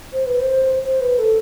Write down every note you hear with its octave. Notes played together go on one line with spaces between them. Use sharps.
C5
B4
C5
C5
B4
A4